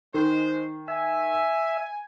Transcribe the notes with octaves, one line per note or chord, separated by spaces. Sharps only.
D#3 G#3 C5
E5 G#5